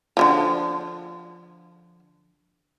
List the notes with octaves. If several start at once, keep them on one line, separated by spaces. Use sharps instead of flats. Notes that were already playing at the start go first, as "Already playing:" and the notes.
D3 E3 F3